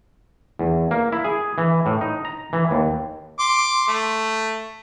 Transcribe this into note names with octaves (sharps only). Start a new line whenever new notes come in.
E2
A#3
E4
G#4
E3
A2
D#4
A#5
E3
D#2
C6 D6
A3